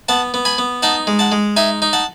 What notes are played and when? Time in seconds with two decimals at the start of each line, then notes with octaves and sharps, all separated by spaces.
0.09 B3 F#5 A5
0.34 B3
0.45 G#5 B5
0.58 B3
0.82 D#4 F#5 A5
1.07 G#3
1.19 F#5 A5
1.32 G#3
1.57 D#4 E5 G#5
1.82 D#4
1.93 F#5 A5